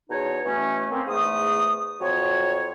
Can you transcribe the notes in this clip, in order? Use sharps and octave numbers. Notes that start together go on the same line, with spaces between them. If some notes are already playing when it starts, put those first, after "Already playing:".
E2 B2 D#4 C#5
B2 E3 A3 C#4
A#3 C4
E2 G#2 A3 D#6
F2 F#3 C#5